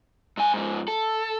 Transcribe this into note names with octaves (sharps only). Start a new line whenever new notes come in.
G2 G#5
G#2 F3
A4